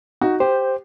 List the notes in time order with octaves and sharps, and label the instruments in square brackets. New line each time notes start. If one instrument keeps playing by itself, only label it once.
[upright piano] D#4 F#4
[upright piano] G4 [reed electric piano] C5